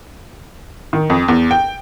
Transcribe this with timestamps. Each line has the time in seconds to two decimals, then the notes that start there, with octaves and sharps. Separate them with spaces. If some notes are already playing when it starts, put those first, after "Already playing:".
0.93 D#3
1.10 F2
1.28 E2
1.51 G5